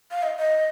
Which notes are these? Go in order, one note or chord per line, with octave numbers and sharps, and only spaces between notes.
F5
D#5
D#5